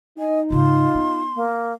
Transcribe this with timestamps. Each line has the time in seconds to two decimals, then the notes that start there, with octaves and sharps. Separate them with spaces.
0.19 D#4 D#5 G#5
0.51 G#2 C#3 F4 C6
0.95 B3
1.35 A#3